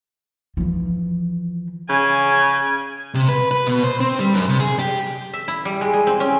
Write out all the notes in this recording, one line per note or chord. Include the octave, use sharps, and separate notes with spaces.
E3 F3
C#3 G#5
C3
B4
B4
B2
C5
C4
G3
F#2
C3
G#4
G4
E5
E4
G3
G#3
G#4
C4
C#4